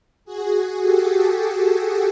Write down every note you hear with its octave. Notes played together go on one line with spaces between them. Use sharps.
F#4 G#4
G4 A4